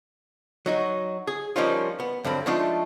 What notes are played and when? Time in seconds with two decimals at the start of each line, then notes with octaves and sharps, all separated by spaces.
0.66 F#3 D#4 F#4
1.27 G#4
1.56 F3 G3 A#3 C#4 D#4 F4
2.00 B3
2.24 G2 D3 F#3 C4 B5
2.46 F3 G#3 A3 D4 D#4 F4